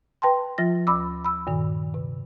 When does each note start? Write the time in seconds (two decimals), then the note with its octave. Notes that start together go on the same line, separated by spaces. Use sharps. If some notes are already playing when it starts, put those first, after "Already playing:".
0.22 B4 G5 A5 C6
0.58 F3 F4 A6 A#6
0.87 D2 B5 D6 E6
1.25 B5 E6
1.47 G2 A#2 D#3
1.94 C3